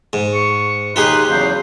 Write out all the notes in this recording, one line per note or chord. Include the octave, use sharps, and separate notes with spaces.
G#2
C#6
D#2 D#4 F4 G4 G#4 B4 C6
E2 C#3 F#3 C5